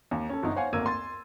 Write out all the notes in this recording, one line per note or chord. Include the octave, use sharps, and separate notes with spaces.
D#2
C#4 A4
G1 B2 D#4
C5 C#5 F5 F#5 G#5
G#1 D2 A#3 E6 G#6 D#7
C6 A6